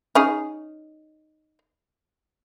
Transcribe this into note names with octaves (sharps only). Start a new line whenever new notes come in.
C#4 D#4 G#4